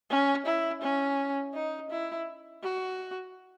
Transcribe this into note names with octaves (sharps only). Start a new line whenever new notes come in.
C#4
E4
C#4
D#4
E4
F#4